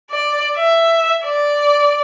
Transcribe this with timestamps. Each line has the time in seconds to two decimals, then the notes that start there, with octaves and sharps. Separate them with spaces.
0.11 D5
0.57 E5
1.24 D5